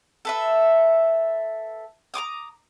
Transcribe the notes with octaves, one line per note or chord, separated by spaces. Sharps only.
A4 B4 E5
A#5 C6 D6 D#6